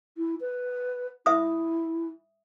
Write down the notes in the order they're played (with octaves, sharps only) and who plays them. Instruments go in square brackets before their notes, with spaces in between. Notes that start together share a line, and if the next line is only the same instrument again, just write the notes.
[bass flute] E4
B4
[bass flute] E4 [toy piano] E5 D#6